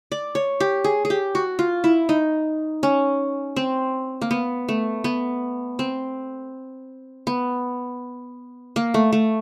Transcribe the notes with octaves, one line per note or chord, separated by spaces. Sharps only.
D5
C#5
G4
G#4
G#4
G4
F#4
F4
E4
D#4
C#4
C4
A#3
B3
A3
B3
C4
B3
A#3
A3
A3